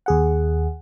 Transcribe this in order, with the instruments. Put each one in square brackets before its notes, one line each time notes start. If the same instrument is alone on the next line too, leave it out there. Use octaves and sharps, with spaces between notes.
[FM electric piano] D#2 G#4 F#5